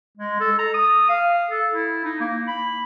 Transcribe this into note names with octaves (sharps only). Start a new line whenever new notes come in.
G#3
A4
A#5
D#6
F5
A4
E4
D#4
A#3
B5